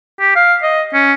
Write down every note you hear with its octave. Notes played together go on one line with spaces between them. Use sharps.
G4
F5
D#5
C#4